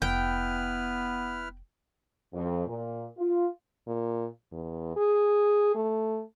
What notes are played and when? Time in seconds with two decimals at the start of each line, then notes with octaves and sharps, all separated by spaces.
0.02 F1 B3 E4 B4 G5 F6
2.34 F2
2.66 A#2
3.18 F4
3.87 A#2
4.52 E2
4.96 G#4
5.75 A3